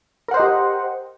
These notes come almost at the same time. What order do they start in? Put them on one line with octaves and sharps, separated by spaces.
A#4 F#5 C5 D#5 G4